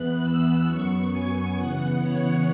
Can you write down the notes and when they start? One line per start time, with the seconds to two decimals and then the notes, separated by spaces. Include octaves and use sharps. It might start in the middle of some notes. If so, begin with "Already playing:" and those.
Already playing: E2 E3 B3 F#6
0.20 E6
0.65 F#2 F#3 B3 C#6
1.10 G#5
1.54 C#3 E3 B3 F#5
2.00 C#5